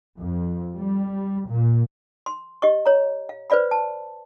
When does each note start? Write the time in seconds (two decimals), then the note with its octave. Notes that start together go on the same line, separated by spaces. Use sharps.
0.18 F2
0.74 G3
1.48 A#2
2.26 C6
2.62 G4 D#5 C#6
2.86 C#5 A#5
3.29 F5
3.50 B4 C5 D5 F5 B5
3.71 A5